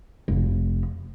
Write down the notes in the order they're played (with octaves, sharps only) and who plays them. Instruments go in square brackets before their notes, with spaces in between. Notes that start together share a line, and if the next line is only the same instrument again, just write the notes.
[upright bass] F1